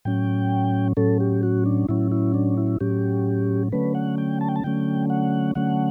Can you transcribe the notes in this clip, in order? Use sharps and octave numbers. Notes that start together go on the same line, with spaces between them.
A2 F#3 C#4 G5
A2 F#3 C#4 A4
G4
F#4
D4
A2 F#3 C#4 E4
E4
D4
E4
A2 F#3 C#4 G4
D3 F#3 A3 C#4 B4
F#5
G5
A5
G5
A5
D3 F#3 A3 C#4 G5
F#5
D3 F#3 A3 C#4 F#5